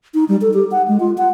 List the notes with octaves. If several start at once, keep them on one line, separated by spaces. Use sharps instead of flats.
D#4
G3
A4
G4
F#5
G#3
F4
F#5